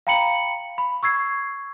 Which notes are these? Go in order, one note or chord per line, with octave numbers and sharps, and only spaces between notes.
F5 G5 A#5 B5 C#7 F#7
B5
C#6 E6 G#6 C7